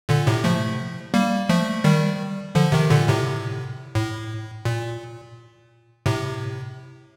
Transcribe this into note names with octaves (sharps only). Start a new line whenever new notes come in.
A#2 D3
A2 C3
F3 A3
G3 A#3
F3 A3
D#3 G3
D3 F3
C3 D#3
A#2 D3
A2 C3
A2
A#2
A2 C3